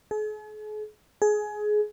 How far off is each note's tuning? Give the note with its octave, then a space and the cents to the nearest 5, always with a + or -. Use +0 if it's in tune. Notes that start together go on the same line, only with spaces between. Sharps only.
G#4 +45
G#4 +20